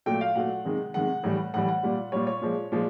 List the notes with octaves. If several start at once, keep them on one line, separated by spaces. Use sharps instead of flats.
A#2 F#3 A3 G5
F5
A#2 F#3 A3 F#5
C3 D#3 G#3
C3 D#3 G#3 F#5
A2 E3 G3
A2 E3 G3 F#5
F#5
A#2 G3
A#2 G3 C#5
C#5
A#2 F3 G#3
A#2 F3 G#3